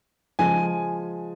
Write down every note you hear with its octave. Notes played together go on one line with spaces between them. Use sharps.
C#3 F3 G#3 G#5